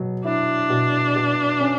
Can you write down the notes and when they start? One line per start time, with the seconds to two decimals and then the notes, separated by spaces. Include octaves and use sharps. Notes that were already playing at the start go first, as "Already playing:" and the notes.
Already playing: B2 F#3
0.25 D4 E4
0.70 B2
1.16 B2
1.61 C#4